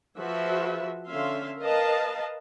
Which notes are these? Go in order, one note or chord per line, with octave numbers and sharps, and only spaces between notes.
F3 F#4 G#4 B4 E5
D3 C#4 E5 F5 C6
A#4 B4 D#5 F5 A5